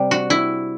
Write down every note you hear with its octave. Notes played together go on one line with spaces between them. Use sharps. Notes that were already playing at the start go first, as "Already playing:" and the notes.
Already playing: C3 G3
F#4
E4